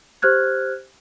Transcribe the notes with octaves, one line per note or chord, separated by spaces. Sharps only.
G4 C5 F6 F#6 G#6